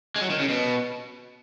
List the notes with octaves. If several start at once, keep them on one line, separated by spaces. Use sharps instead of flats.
G#3
F#3
D#3
C#3
B2